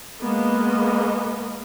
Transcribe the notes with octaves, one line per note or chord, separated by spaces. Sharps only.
G#3 A#3 B3 D#5